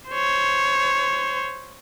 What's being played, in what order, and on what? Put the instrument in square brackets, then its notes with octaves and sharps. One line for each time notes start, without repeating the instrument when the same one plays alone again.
[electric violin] C5 C#5